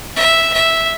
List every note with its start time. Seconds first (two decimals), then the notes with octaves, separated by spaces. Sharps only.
0.16 E5
0.54 E5